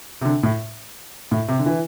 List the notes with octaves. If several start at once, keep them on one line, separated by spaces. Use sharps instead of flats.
C3
D3
A2
A2
C3
D3
E3